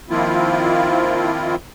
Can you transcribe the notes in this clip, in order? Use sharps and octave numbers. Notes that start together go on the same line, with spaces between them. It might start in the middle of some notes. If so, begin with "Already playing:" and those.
D#3 F3 A#3 C4 E4 F4